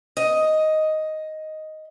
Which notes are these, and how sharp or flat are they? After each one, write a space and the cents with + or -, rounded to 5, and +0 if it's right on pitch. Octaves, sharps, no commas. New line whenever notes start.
D#5 +5